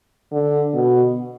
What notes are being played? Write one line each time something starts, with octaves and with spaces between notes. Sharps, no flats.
D3
B2